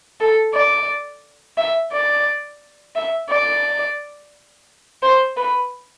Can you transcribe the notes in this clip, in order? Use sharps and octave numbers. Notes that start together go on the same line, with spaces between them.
A4
D5
E5
D5
E5
D5
C5
B4